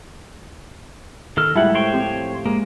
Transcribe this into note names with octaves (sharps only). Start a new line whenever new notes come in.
D#3 A4 F6
A2 G3 G#3 E4 F#5 A5
C5 C#5 G5
F3 C4 G4
G#3 A#3